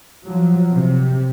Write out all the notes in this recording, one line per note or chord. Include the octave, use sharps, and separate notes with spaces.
F3 F#3
C3